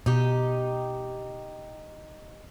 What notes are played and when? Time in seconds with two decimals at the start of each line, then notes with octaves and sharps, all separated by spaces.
0.06 B2 D#4 G4